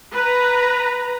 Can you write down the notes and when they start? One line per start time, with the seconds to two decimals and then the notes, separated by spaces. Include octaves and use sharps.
0.13 B4 A#5